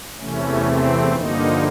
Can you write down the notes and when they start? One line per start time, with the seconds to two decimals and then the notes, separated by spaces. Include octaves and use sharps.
0.19 E2 C3 E3 A3 C#4
0.66 C4
1.14 G2 D3 F3 A#3 D#4